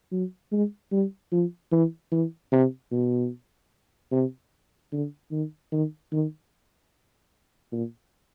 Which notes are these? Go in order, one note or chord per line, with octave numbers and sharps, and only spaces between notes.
F#3
G#3
G3
F3
E3
E3
C3
B2
C3
D3
D#3
D#3
D#3
A#2